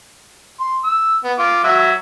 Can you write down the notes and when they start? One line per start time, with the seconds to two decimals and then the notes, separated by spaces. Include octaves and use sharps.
0.60 C6
0.84 E6
1.24 B3
1.39 F4 D6
1.64 F#3 F#4 E5